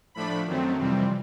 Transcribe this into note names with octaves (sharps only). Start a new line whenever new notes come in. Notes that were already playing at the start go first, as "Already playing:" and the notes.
A2 F3 A3 D4 B5
F#2 D#3 F#3 A3 C4
F2 C3 E3 G3 C4